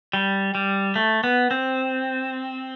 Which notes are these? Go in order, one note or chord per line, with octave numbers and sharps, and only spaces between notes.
G3
G3
A3
B3
C4